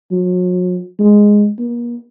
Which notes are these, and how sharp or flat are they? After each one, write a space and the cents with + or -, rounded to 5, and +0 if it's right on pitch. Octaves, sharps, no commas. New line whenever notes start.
F#3 -40
G#3 -5
A#3 +40